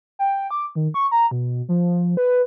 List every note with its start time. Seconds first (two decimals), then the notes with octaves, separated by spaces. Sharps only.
0.19 G5
0.51 D6
0.75 D#3
0.94 C#6
1.12 A#5
1.31 B2
1.69 F3
2.17 B4